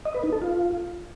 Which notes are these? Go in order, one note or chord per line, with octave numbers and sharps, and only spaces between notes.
D#5
B4
D#4
A4
F4